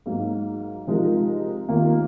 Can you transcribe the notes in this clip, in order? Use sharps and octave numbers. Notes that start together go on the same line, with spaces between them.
G#2 F#3 A#3
C3 F3 G#3 D#4 A#4
D#2 D#3 A#3 F4 A#4